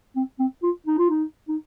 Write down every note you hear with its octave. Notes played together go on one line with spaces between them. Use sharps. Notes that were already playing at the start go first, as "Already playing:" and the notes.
C4
C4
F4
D#4
F4
D#4
D#4